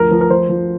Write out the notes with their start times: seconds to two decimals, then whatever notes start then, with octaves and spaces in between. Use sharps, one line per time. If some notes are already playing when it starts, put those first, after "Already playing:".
Already playing: D2 F3 A#4
0.11 F3
0.21 A#4
0.30 F3 C5
0.49 F3